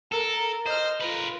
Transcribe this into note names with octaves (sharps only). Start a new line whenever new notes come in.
A4 A#4
C5 D#5 F6
F4 A#4 B4